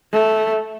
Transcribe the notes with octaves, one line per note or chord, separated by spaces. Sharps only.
A3